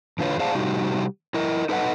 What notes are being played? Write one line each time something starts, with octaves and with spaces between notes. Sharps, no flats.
E2 D3 F4 B4 C#5
G#4 C5 D5 F5 F#5 A5
C3 G3 D#4 F#4 G4
E4 A#4 D#5
D#4 A4 B4 D#5 F#5